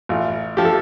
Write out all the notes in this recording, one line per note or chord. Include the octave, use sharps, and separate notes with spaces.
A1 F4
F3 G4
A4